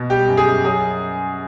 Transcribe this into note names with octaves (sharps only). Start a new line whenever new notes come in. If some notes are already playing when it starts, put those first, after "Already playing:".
Already playing: B2
G3 G4
F#2
G#4
F#2
F#3 G#4